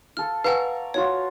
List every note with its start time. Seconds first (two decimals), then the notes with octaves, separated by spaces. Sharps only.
0.17 F4 A4 F6
0.44 B4 D5 F5 F#5 G#5 A#5 C#6 E6
0.94 F4 F#4 C#5 C#6